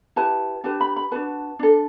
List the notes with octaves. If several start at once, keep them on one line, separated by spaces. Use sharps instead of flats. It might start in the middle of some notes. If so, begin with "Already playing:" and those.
E4 G4 B4 A5
D4 G4 B4 A5
B5
B5
D4 F#4 B4 A5
D4 A4